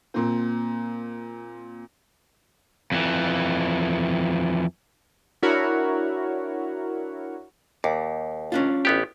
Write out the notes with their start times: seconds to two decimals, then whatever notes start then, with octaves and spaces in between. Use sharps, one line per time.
0.14 A#2 C4
2.92 F2 E3
5.43 D4 E4 F#4 A#4 C#5
7.84 D#2 D5
8.52 C#4 D4 F4
8.85 A1 B3 G4